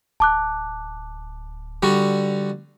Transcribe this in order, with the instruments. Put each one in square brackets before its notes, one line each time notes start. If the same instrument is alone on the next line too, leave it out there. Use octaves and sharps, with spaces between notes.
[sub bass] D1 [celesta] A5 D6 F#6
[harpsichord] D3 G3 F#4